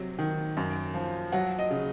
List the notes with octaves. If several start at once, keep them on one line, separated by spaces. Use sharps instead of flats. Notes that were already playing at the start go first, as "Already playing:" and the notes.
Already playing: C3 F#3
D#3
F#2
F3
F#3 F#5
D#5
C#3